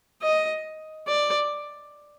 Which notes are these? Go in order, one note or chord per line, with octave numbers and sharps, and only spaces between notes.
D#5
D5